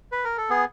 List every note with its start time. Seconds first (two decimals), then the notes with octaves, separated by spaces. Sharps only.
0.12 B4
0.24 A#4
0.37 A4
0.50 B3 G#4